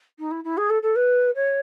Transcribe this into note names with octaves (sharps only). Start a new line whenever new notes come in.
D#4
E4
E4
G#4
A4
A4
B4
C#5